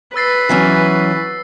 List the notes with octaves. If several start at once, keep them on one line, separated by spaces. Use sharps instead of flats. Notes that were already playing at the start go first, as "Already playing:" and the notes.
B4 E6 A6 C7
E3 F#3 C#4